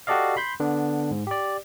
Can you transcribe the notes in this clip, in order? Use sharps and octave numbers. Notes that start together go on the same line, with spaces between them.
F#4 G4 A4 D5 D#5 F5
B5 C6 G6
D3 B3 D4
G#2
G4 D5